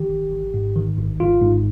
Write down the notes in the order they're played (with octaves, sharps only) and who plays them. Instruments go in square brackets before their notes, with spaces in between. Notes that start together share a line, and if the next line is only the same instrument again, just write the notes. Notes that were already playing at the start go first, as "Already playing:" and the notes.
Already playing: [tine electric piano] D#3 G4
G#1
G#1
G#2
D#3
G#1
G#1 F4
G#2